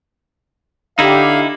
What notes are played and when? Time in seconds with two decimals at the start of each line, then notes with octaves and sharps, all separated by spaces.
0.99 D3 D#4 E4 G4 F5